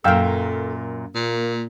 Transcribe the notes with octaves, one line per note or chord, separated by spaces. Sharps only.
F#2 A#2 A4 F5 G5 E6
A#2 A#3